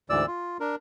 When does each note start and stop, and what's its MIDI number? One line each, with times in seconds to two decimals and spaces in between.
0.10 0.26 38
0.10 0.26 44
0.10 0.26 52
0.10 0.26 74
0.10 0.26 88
0.27 0.57 65
0.60 0.75 62
0.60 0.75 70